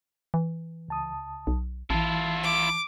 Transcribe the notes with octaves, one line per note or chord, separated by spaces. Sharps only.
E3
C#2 A5 D#6
B1
A1 E3 E4 F4 A5
D6